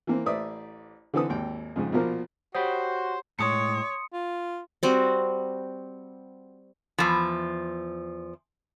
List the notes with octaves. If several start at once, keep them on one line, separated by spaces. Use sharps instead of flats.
E3 A#3 C4
A1 B4 C5 D5 E5 D#6
D3 E3 C4 A4 B4 D#6
G#1 D#2 G5
F2 G#2 C#3
A#1 B2 F3 A#3 A#4
F#4 G4 C5 C#5 D#5 F#5 G5 B5
A2 G#3 C#5 C6 D#6 C#7
F4
G3 C4 F#4
E2 F3